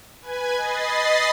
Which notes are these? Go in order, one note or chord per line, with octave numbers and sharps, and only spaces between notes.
B4 G#5 G#6
D#5 B5 A6 C7